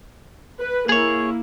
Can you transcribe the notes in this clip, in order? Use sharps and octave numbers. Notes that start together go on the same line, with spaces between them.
B4
A#3 E4 G#4 C#5